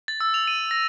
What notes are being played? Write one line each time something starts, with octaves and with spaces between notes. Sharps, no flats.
A6
E6
F7
D#7
A#6